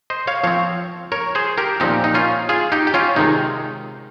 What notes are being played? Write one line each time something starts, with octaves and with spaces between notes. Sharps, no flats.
C5 D#5
C#5 F5
F3 C4 C#5 F5
A#4 C#5
G#4 C5
G4 A#4
A#2 F3 C4 D#4 G4
D#4
C#4 F4
F4 G#4
D#4 G4
G4
C#4 F4
C3 D#3 G#3 D#4